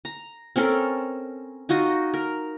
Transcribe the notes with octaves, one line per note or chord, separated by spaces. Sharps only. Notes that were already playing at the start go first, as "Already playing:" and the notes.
A#5
C4 C#4 A4 A#4
D#4 F4 F#4 D#5
A#4